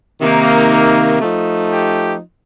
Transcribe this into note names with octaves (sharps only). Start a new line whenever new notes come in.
C3 D#3 A#3 D#4
F3 A3 D#4
G4